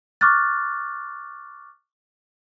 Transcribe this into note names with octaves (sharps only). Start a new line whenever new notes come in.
C#6 D6 F6 F#6 A6